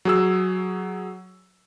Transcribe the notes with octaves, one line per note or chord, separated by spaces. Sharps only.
F#3 G#4 E6